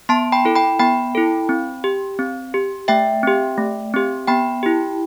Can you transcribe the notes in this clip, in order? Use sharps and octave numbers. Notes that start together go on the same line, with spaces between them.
B3 A5 C6
G5 B5
E4 A4
G5 B5
B3 G5 B5
E4 A4
C4
G4
C4
G4
A3 E5 G5
C4 G4
A3
C4 G4
B3 G5 B5
E4 G4